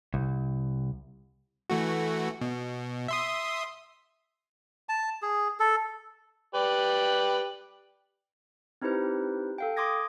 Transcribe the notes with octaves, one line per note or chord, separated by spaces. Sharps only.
C2
E3 A3 F#4
B2
E5 C6 D#6
A5
G#4
A4
G4 B4 D5
C4 D#4 E4 G4 B4 C5
A4 F5 G5
C6 D6 D#6 G#6 A#6